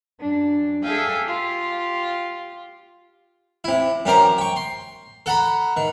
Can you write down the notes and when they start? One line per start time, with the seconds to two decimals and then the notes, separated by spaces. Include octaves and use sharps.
0.20 F#2 D4
0.83 G#4 A4 E5 F5 G5 G#5
1.24 F4 G4
3.64 C3 E4
4.05 F#2 G4 A#4 C5 A#5
4.38 G5 C#6
4.56 C6
5.26 A4 F#5 A#5 B5
5.77 D#3